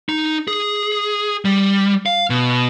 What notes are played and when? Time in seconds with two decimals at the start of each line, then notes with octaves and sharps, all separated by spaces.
0.09 D#4
0.48 G#4
1.45 G3
2.06 F5
2.30 B2